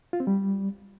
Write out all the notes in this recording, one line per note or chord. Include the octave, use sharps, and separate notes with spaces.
F4
C4
G3